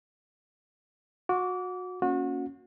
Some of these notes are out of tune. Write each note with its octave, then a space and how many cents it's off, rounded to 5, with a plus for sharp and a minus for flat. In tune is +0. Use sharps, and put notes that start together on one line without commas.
F#4 -25 D6 -30
A#3 +0 C#4 +0 F#4 -30